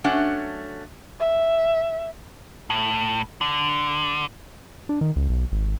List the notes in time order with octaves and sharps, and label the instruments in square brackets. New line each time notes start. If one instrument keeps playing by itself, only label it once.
[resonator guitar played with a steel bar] F#3 A3 C#4 D4 F#5
[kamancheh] E5
[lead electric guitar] A2
D3
[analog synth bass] D4
D#3
C#2
B1
G#1